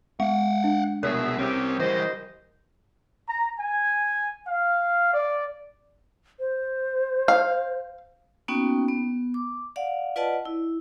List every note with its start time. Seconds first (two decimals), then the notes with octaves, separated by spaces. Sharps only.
0.20 G#3 F5 F#5
0.64 D4
1.03 C2 B2 G#4 A#4 E5
1.39 C2 C3 C4 C#4 G4
1.79 E3 G3 C5 D#5
3.28 A#5
3.59 G#5
4.46 F5
5.13 D5
6.40 C5
7.28 F5
8.48 A#3 B3 C#4 D#4 F#4 G5
8.88 B3
9.34 D6
9.76 D5 F5 F#5
10.16 F4 B4 D5 D#5 F#5 A5
10.45 E4